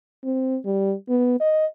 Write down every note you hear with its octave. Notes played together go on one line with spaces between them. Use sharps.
C4
G3
B3
D#5